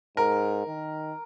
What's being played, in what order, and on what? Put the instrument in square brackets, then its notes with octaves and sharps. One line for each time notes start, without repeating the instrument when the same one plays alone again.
[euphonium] G#2 [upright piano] A#4
[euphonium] D#3